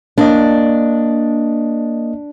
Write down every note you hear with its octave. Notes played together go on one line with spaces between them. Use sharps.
A#3 D4 D#5